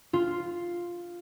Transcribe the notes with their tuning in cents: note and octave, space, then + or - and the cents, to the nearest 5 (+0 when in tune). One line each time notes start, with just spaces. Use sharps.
F4 +0